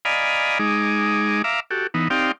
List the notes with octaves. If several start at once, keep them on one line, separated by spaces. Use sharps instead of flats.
D5 D#5 F5 G#5 A#5 B5
G#3 D#4 G#4 D6
E5 F5 A#5 D6
F#4 G4 A4
E3 B3 D#4
C4 D#4 G4 D5 F5 G5